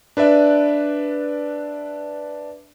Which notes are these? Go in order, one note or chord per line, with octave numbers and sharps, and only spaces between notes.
D4 B4 D5 E5